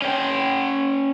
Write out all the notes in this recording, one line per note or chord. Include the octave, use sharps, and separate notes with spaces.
C#4 G5